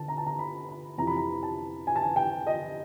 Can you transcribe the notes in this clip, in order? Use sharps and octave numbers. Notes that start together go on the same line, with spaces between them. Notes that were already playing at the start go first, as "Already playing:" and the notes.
Already playing: D3 A5
A#5
A5
A#5
B5
B5
F2 C3 E3 A#5
B5
A#5
A5
G#5
A5
G#5
G5
D#5